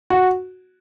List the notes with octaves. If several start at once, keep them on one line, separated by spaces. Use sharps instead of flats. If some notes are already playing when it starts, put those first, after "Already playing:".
F#4